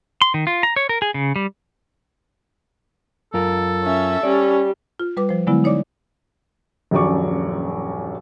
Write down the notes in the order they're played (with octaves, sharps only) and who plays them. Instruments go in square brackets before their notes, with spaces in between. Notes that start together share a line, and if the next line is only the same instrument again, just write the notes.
[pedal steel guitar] C6
D#3
F4
A#5
C#5
A#4
G#4
C#3
G3
[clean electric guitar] F#2 F4 A#4 [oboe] A4
[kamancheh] C#4 E5
[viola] G3 [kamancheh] C#4 [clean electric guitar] D5
[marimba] F4
G3 B4 D6
F3 C5
D3 F#3 G#3 B3 E4
D#4 C#5 D5 D6
[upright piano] D#1 A#1 F#2 D5 C#6 D6